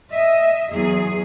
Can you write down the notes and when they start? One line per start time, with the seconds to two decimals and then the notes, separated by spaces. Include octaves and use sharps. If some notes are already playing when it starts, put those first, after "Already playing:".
0.11 D#5 E5
0.71 E2 F#3 G#4